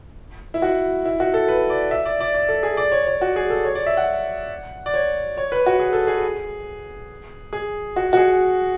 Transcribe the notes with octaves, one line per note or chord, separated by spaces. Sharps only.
E4
F#4
E4
F#4
A4
B4
D5
E5
D5
D5
D5
A4
G#4
D5
C#5
C#5
F#4
G#4
A4
C#5
D5
E5
F#5
D5
C#5
C#5
B4
F#4
G#4
A4
G#4
G#4
F#4
F#4
G#4